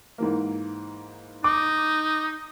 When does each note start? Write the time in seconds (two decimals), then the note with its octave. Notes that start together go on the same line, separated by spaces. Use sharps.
0.18 G#2 E3 A#3
1.44 D#4 D6